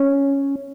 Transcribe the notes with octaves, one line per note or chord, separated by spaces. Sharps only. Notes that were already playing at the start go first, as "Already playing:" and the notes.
Already playing: C#4